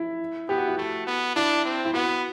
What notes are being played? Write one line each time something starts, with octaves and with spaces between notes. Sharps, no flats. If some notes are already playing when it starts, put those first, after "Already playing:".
Already playing: E4
B3 G4
F#4
E4
A3 F#4
B3
D4 E4
C4
E4
B3 F#4